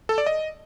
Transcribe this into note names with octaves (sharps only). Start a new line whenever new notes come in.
A4
D5
D#5